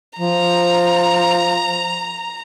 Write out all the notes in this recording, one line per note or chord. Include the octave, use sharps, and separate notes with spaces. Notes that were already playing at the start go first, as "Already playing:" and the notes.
F3 A#5